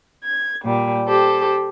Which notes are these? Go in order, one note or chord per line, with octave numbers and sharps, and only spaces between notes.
G#6
A#2 G3
G4 A4 C5